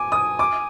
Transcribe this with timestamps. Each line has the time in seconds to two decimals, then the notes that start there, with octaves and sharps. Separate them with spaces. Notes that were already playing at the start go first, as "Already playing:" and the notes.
Already playing: G#5 D6
0.12 D#6
0.39 D6